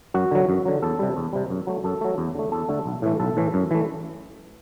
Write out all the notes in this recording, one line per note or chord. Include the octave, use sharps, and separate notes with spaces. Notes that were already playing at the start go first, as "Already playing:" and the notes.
F#2 F#4
D3 F#3
F#2
D3 F#3
E2 A4
C3 G3
E2
C3 G3
F#2
F#3 A3
F#2 A4
F#3 A3
E2
D3 A3
E2 A4
D3 A3
B1
A2 E3 A3
B1 A4
A2 E3 A3
F#2
E3 A3